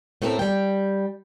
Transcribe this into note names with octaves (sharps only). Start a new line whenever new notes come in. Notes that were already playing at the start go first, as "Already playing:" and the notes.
A2 A3 C4 A4 A#4
G3 G5